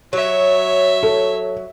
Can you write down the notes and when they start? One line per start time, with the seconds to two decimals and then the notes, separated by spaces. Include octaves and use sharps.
0.13 F#3 C#5 E5
1.03 A4